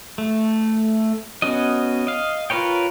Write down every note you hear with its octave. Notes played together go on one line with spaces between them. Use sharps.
A3
B3 C#4 F#4 D#5
D#5 F5
F4 A#4 B4 C#5 G5